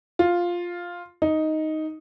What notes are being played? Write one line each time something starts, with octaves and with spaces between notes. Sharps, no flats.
F4
D#4